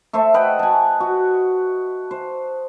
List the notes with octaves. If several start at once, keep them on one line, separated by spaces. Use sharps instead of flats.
A3 A4 C5 E5
B4 D#5 F#5 G5
G#5 A5
F#4
C5